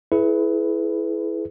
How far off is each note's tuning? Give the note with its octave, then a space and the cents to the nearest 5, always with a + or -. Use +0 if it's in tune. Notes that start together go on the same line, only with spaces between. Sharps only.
E4 +0 G#4 +40 B4 +10